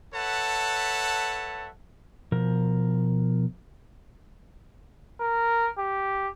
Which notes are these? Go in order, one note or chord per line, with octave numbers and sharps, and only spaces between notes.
A4 B4 C#5 E5 F#5 A5
B2 F3 A#4
A#4
G4